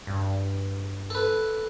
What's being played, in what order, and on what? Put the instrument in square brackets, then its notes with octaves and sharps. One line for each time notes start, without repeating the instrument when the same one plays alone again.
[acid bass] G2
[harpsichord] A4 B4